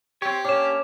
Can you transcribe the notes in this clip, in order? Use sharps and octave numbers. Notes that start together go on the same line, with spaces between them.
C4 G4 C#5
A#3 C#4 D4 C#5 D6 E7